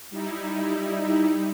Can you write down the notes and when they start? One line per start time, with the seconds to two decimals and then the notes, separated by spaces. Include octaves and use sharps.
0.11 G3 D#4 E4